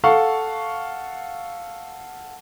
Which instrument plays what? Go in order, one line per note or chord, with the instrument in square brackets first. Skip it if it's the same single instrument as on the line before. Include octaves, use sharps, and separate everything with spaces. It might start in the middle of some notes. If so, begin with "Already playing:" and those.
[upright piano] A4 F5 F#5 C#6